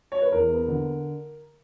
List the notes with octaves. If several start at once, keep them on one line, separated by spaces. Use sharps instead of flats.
C#5
B4
E2 A#4
B3
D3